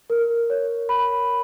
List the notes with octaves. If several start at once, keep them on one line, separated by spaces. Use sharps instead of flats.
A#4
C#5
B5